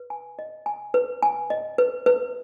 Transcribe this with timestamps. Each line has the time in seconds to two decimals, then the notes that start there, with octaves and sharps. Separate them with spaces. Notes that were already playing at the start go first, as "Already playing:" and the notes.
Already playing: B4
0.10 G#5
0.39 D#5
0.66 G#5
0.94 B4
1.23 G#5
1.50 D#5
1.78 B4
2.06 B4